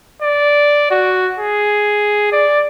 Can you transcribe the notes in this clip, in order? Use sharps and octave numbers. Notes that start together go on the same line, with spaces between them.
D5
F#4
G#4
D5